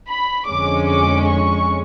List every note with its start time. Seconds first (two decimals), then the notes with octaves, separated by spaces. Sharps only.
0.09 B5
0.48 F2 D3 G#3 C#4 D6
0.88 D6
1.29 C#6